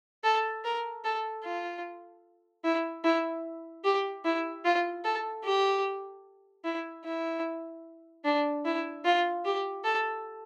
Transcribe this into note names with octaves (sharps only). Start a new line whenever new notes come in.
A4
A#4
A4
F4
E4
E4
G4
E4
F4
A4
G4
E4
E4
D4
E4
F4
G4
A4